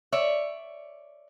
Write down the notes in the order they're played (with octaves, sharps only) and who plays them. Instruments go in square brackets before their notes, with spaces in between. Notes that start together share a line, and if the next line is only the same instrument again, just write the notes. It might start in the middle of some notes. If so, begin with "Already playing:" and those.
[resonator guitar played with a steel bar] C#5 D5 E5